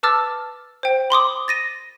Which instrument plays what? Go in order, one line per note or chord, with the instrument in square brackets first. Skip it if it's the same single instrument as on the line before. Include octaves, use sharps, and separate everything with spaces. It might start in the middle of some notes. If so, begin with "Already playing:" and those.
[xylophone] B4 A5 D6 E6 F6 A6
C5 G5
B5 C6 D6 D#6
A6 A#6 D#7